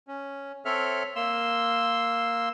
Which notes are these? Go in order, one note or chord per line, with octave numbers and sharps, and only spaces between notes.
C#4
C4 A4 C#5 E5 F6
A#3 C6 E6